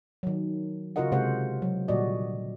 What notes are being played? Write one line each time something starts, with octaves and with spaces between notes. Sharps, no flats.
D#3 F#3
C#3 F4 F#4 A#4 D#5 F#5
C3 G#3 C5 F#5
F#3
A#2 D3 G3 F#4 D5 D#5